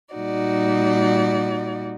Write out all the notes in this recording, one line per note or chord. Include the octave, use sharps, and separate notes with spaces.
A#2 G3 D#4 F#4 D5